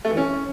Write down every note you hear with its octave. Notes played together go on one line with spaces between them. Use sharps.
A3
E3
C#4